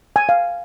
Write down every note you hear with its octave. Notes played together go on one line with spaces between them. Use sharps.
G#5
F5